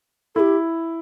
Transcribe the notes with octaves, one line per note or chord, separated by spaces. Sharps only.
E4 G4 A4